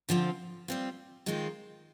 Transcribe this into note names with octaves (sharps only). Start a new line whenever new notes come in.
D3 F3 C4 F4
G3 C4 F4
D#3 G#3 C4 F4